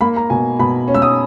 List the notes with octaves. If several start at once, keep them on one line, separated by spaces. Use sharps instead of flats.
A#3 B5
A#5
B2 G#5
B2 B5
C#4
E6
D#6